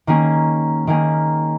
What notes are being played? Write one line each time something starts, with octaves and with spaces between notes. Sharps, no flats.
D#3 A#3 C#4 G#4
D#3 A#3 C#4 G#4